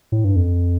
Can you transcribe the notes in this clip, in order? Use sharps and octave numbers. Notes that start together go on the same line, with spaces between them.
A2
G2
F2